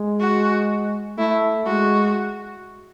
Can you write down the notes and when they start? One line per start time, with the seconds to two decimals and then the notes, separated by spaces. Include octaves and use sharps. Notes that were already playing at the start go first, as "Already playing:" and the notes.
Already playing: G#3
0.21 F#4
1.18 A3 E4
1.67 G#3 F#4